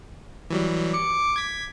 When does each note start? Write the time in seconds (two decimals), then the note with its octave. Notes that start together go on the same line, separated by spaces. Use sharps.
0.50 E3 F#3 G3
0.94 D6 C#7
1.36 G#6 B6